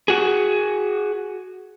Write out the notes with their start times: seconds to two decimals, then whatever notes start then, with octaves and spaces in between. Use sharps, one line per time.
0.08 F#4 G#4